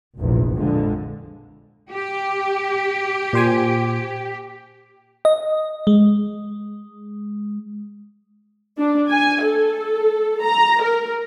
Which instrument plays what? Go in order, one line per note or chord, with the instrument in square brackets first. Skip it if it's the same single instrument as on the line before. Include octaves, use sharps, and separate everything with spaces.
[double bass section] F1 A#1 E2
A#1 F2 D3 F3 G#3
[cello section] G4
[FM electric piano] A#2 C5 G#5
D#5
G#3
[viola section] D4
G#5
A4
A#5
A#4